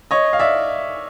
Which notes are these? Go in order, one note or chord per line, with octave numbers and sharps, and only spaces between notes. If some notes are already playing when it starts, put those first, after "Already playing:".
C#5 D#5
F5
D5 E5